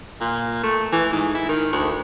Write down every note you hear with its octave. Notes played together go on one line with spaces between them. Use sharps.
A#2
A3
E3
G#2
E4
D#3
D2